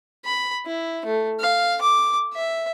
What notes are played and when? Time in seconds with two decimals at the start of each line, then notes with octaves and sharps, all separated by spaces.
0.25 B5
0.66 E4
1.05 A3
1.40 F5
1.81 D6
2.34 E5